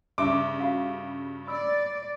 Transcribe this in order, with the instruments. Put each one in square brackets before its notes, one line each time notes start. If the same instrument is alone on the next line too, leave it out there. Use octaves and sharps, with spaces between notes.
[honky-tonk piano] G2 C#3 [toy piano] D5 E5 [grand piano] D6
[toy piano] F#4 F5
[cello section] D5 [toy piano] B5 E6